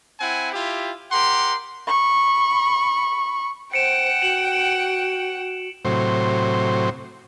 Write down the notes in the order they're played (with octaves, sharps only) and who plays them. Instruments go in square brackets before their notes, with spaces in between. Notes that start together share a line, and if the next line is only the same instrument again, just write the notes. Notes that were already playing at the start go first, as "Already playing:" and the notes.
[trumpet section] C4 E4 F#5 G#5
E4 F4 G4
G4 A#4 F#5 C6
[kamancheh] B5 C#6
[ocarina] C5 [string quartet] F#5 G5 [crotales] C#7 D7 E7
[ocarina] F#4 [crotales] E7 F#7
[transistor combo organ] A2 C3 F#3 C5